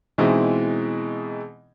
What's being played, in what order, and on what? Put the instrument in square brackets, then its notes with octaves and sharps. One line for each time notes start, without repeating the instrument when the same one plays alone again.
[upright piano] B2 E3 G#3 C4 D#4 E4